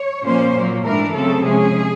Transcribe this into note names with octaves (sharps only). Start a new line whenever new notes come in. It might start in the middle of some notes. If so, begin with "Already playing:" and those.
Already playing: C#5
A#2 F3 A#3 C#4 C5
A#2 F#3 A#3
G#2 E3 A3 D4 A#4
C#3 F#3 A3 C4 A4
C3 F3 G#3 C#4 G#4